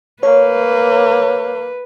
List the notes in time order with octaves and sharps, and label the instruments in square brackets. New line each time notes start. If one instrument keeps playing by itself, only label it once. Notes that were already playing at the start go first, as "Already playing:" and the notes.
[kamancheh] A#3 [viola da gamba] B4 [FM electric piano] C#5